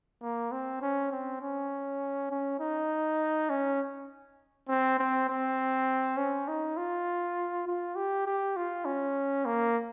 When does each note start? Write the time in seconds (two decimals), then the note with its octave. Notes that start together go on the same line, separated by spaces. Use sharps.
0.22 A#3
0.52 C4
0.82 C#4
1.12 C4
1.42 C#4
2.31 C#4
2.60 D#4
3.50 C#4
4.69 C4
4.99 C4
5.29 C4
6.17 C#4
6.48 D#4
6.77 F4
7.67 F4
7.96 G4
8.26 G4
8.57 F4
8.85 C#4
9.46 A#3